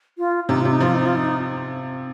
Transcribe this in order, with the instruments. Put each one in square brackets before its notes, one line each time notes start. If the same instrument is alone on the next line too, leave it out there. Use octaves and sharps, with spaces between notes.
[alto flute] F4
[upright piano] C3 [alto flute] D#4
[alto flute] F4
[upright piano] C3
[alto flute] D#4
[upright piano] F3 [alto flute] F4
[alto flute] D#4
F4
D#4